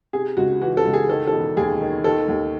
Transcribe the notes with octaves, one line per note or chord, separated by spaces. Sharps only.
C3 G#4
C#2 F#4
E3 F#4
A4
C#2
G#4
D#3 A4
A4
E1
D#2 G#4
D#3
D#3 A4
D#2